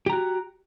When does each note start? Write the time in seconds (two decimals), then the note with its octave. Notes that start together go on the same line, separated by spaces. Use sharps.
0.06 G4
0.10 A#5
0.13 F#4